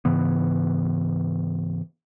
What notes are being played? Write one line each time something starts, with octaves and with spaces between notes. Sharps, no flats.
G#2 C#3 E3 B3